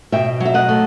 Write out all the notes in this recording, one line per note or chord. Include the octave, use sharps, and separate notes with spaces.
B2 E5 G5
F#3
E5
D#5 F#5
A3